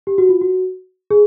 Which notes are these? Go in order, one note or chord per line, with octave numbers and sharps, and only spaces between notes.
G4
F#4
F4
F#4
G#4